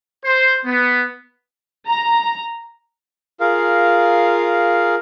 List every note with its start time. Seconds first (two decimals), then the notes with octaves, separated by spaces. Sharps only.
0.25 C5
0.65 B3
1.87 A#5
3.40 F4 G#4 A#4 F5